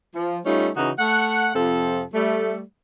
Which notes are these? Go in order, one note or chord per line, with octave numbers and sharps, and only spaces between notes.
F3
G3 A3 C#4 D#4 F4
C#3 E3 D#4 F#4
A3 F#5
F2 C3 F3 C4 A4
G3 A3